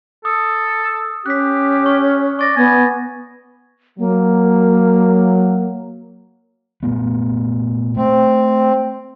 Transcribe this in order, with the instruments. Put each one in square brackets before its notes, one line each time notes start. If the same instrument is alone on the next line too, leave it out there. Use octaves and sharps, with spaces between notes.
[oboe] A4 [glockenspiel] D#6
[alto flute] C#4 [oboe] G4 [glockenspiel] F#6 B6
[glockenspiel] C#6
[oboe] D5 [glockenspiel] C#6 A6 A#6
[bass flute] B3 [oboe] G#5
[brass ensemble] F#3 [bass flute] A#3
[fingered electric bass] A#2 A3 B3
[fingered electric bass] A3 [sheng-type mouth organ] C4